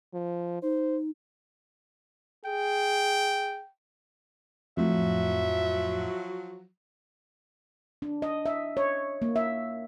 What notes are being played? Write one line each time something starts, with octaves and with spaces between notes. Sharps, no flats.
F3
D#4 C5
G#4 G5
F2 A2 F3 F#3 E5
D4
D#5
E5
C#5
A#3
E5